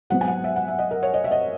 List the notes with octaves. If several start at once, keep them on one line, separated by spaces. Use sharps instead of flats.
G#2 F#3 B3 F#5
G#5
F#5
E5
F#5
E5
D#5
A#4
C#5
D#5
E5
D#5